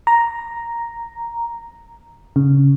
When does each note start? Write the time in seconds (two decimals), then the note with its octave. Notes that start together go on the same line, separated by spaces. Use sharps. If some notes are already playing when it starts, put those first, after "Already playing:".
0.07 A#5
2.36 C#3